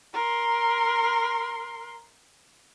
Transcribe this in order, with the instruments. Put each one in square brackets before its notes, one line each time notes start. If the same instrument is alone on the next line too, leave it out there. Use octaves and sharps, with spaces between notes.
[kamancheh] A#4 C6